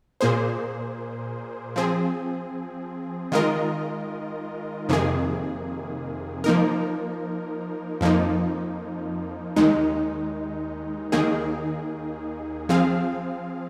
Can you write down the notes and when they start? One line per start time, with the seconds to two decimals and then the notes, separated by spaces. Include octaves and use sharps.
0.21 A#2 A#3 G#4 C5
1.76 F3 C4 G#4
3.32 D#3 G#3 F4 A#4 D#5
4.89 F2 C3 D#3 A#3 G#4
6.44 F3 A#3 D#4 A#4
8.01 F2 F3 A#3 D#4
9.56 D#2 D#3 G#3 D#4
11.12 D#2 D#3 A#3 D#4 G#4
12.69 F3 C4 G#4 F5